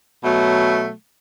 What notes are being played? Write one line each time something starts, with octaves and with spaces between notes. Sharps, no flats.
B2 F#3 A3